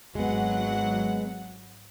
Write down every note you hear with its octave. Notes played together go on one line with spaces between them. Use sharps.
G#1 F#3 G#3 B3 F#5